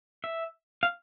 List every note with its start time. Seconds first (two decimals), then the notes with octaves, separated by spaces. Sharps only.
0.24 E5
0.83 F5